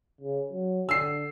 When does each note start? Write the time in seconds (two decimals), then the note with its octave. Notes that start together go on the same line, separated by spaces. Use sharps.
0.21 C#3
0.52 F#3
0.89 D3 E6 C7